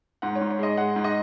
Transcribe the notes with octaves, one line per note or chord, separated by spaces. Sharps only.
G#2 F#5
C#5
G#2
C#5
G#3 D#5
G#3 F#5
G#2
D#5